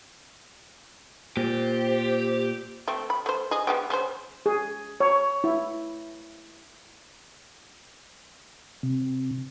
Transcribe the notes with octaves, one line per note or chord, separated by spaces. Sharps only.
A#2 G4 C5
A3 C4
B5
A3 C5
G#4 D#5
G#3 B3 G4
C#3 C5
G#4
C#5
E4
C3